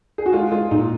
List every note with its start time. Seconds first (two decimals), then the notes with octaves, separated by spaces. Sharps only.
0.18 G#4
0.26 F#4
0.33 G#3 F4
0.52 G#3 F4
0.71 A#2 D#4